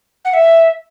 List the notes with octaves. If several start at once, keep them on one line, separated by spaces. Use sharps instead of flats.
F#5
E5